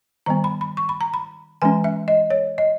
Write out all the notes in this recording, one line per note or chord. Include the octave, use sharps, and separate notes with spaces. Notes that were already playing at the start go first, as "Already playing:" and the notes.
D#3 G3 B3 A#5
B5
B5
C#6
B5
A#5
B5
E3 G#3 C#4 G#5
E5
D#5
C#5
D#5